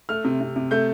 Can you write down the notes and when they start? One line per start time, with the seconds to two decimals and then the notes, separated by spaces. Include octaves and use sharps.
0.09 A3 F6
0.24 C3
0.41 C3
0.56 C3
0.71 A3 G6